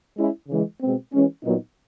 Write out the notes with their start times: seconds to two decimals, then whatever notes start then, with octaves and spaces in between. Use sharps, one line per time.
0.16 G#3 C#4 E4
0.48 C#3 E3 G#3
0.80 B2 G#3 C4
1.12 E3 G#3 C#4
1.43 A#2 F#3 B3 D#4